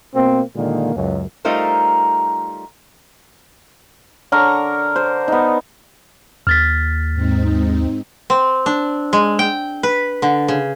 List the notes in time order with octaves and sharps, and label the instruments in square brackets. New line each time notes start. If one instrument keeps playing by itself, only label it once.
[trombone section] B2 A#3 C4
A#2 D3 D#3 G#3 A#3
C#2 F#2
[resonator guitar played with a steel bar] G3 A3 D#4 F4 A#4 C5
[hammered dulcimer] D3 A#4 A#5 C#6
C5
B3 D#4
[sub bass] D#2 [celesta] F6 A6 B6
[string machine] G#2 C4 D#4
[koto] C4
D4
G#3
G5
B4
D3
C#3